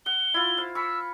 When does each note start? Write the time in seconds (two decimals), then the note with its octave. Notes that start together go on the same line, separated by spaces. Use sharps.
0.06 F#5 G7
0.34 E4 F4
0.57 C5 F5
0.75 B5 C#6 E6